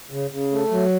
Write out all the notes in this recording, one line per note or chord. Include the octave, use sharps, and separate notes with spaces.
C#3
C#3
A3
F#3